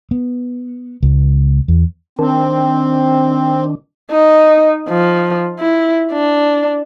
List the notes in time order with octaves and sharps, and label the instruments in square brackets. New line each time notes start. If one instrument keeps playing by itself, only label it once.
[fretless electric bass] B3
C#2
E2
[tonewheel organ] D#3 D4 [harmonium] C4
[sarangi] D#4
F3
E4
D4